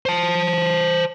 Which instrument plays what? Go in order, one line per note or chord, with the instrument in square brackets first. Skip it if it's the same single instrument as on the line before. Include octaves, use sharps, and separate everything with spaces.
[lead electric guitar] C5 A5